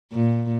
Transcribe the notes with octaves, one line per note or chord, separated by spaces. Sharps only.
A#2